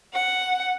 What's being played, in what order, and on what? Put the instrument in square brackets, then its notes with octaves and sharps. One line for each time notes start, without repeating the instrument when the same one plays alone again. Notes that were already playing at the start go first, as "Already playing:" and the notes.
[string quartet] F#5